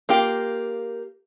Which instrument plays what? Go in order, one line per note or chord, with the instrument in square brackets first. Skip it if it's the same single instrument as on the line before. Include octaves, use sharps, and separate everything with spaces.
[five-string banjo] A#3 F4 G4